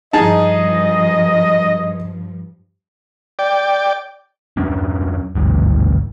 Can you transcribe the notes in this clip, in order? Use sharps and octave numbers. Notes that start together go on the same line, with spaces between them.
G2 F3 D#4 G#4 D#5 A5
D5 G5
F2 F#3 C#4 D4
G#1 D2 G2